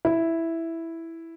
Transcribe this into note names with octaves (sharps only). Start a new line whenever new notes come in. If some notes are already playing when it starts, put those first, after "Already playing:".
E4